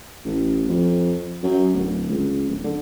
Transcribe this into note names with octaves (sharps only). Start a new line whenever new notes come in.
A1
F2
F#2
D1
C#2
D1
D3